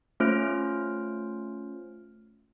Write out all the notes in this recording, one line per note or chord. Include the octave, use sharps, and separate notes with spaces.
A3 C#4 F4 C5 F6 D7